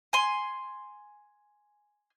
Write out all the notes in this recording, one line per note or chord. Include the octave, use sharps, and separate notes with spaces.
G#5 C6